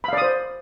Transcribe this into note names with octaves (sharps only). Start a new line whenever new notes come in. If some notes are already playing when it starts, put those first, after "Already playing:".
C5 D5 F5 B5 D#6